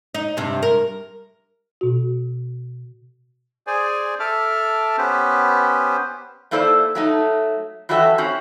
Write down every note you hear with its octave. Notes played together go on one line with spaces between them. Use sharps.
D#4
G2 C3
A#4
B2 F#4
G#4 C5 D5 G#5
A4 E5 A5 D6 F6
B3 C#4 G4 B4 C5
A3 A#3 E4 A4 C5 D5
F#3 A3 D#4
E3 F#3 F#4 G4 A4 E5
C4 C#4 F#4